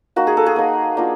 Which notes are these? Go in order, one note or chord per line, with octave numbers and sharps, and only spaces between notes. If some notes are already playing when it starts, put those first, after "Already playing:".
A#3 D#4 F#4
G#4
A4
G#4
A#3 D#4
A#3 D4 F4